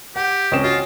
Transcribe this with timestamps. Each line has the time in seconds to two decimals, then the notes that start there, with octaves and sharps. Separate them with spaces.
0.16 G4 F#5
0.52 C#2 C4 C#4 D#5 G5 E7
0.64 F4 F#4